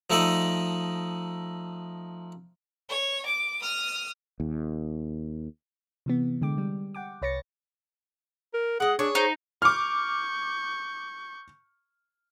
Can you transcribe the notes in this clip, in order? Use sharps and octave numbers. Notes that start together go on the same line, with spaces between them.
F3 A3 D#4 A4 D5 D#5
C#5
D6
D#6 F6
D#2
C3 E3 B3
D3 G#3 G5 D6
G3
F#5 G5 D6
C2 B4 C#5 A6 A#6 C#7
A#4
G#3 D#5 F#5
D4 G#4 C#5
D#4 C5
C#6 D6 F6 G6